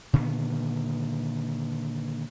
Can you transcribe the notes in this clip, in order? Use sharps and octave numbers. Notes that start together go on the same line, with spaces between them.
A#2 D3 D#3 B3